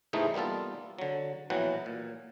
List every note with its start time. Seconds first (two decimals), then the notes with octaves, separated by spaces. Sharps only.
0.13 G#2 C3 E3 G#3 A3 D#4
0.34 G3 A#3 B3 F4 A4
0.99 D3 F#3
1.50 A#1 B2 E3 F#3 F#5 G5
1.86 A#2